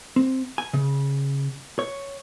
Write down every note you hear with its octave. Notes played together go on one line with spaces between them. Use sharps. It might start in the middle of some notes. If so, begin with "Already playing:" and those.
C4
G#5
C#3
C#5